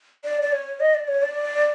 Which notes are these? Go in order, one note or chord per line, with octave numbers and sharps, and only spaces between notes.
D5
D5
C#5
D#5
D5
C#5
D5